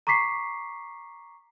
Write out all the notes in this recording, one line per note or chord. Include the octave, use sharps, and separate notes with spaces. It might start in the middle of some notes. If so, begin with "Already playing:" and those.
A#5 C#6 D6 B6 C7